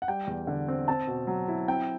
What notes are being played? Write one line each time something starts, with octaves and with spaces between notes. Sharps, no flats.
F#5
G3 G5
E2
D3
C4
C4 A5
B2
F#3
E4
C4 G5